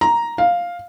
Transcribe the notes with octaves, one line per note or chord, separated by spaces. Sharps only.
A#5
F5